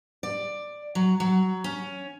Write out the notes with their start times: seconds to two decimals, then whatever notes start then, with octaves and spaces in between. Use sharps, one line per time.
0.23 D5
0.95 F#3
1.20 F#3
1.64 C#4